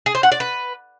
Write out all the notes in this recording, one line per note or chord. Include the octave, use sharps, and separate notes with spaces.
G#4
C5
F#5
D5
B4